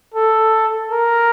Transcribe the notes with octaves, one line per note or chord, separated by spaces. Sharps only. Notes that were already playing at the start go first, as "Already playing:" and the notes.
A4
A#4